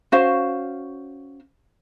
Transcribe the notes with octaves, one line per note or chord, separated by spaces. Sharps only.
C#4 F#4 C5 F5